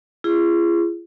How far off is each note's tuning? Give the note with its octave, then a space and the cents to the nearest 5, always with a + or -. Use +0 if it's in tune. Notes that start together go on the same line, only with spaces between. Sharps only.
F4 -45 G#4 -10